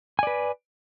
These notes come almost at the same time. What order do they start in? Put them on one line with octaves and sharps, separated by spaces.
G#5 D5 B4